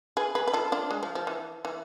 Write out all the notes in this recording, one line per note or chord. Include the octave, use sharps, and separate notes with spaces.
G#4 B4
G#4 B4
B4
F4 A4
D4 F4
G#3
F3
F3
E3
E3